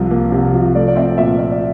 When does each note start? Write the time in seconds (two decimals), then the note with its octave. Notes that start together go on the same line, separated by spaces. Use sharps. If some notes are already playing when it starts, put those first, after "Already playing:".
Already playing: C2 C3 F3
0.11 A#3
0.32 C3
0.54 F3
0.75 A3 D5
0.88 D5
0.96 C4 E5
1.18 A#2 E5
1.39 A#2 E5
1.52 D5